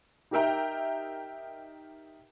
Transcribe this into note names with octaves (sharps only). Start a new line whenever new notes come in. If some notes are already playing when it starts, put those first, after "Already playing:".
D#4 G4 A#4 E5 G5 A#5